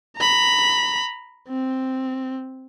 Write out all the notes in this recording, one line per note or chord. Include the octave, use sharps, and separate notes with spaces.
A#5 B5
C4